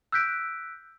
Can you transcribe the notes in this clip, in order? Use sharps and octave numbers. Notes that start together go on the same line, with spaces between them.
E6 F#6 G6 B6 D7